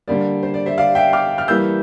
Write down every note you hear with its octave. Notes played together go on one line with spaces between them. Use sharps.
D3 G3 A#3 D5
C5
D5
C5 E5
D5 F5
E5 G5
D6 F6
F6
E3 G3 A#3 E6 G6